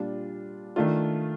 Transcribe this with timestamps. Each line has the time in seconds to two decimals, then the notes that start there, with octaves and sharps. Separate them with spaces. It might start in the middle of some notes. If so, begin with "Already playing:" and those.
Already playing: A#2 G3 D4 F4
0.76 D#3 A3 D4 F4